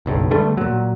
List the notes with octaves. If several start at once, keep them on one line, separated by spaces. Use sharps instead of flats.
F#1 B1 G2
D3 G3 A3 B3
A#2 F#3